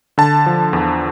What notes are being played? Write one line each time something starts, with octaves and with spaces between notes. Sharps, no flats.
D3 A5
F3
E2